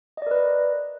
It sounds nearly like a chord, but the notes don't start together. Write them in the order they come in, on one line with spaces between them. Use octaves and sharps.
D#5 D5 A#4 B4